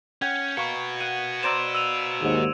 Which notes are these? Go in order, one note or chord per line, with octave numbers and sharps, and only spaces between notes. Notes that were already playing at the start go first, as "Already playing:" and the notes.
C#4 F#5 G5 G#6
A#3 F#4 B4 C#6 C#7
F#5 D#7
C5 D5 A#5 E6 D7 E7
E6 D#7 F7
D#2 G#2